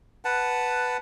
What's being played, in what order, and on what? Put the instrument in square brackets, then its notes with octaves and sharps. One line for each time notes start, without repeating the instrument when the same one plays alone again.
[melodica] B4 F#5 A5